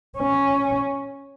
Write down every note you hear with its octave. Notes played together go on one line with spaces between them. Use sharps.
C#4